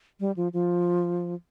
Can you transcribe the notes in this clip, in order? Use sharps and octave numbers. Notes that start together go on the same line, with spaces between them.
G3
F3
F3